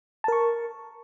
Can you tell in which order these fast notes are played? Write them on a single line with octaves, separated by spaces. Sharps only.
A5 A#4 C#6